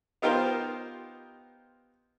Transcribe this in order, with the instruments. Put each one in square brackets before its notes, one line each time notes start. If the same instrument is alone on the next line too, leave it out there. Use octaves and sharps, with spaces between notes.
[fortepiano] B3 D#4 F4 G4 A#4 C5